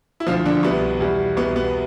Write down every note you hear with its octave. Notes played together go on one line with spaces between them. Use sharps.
E4
D2 D3 F3 F4
D3 D4
C2 B2 G3 B3
E2 B2 G3
C2 B2 G3 B3
B3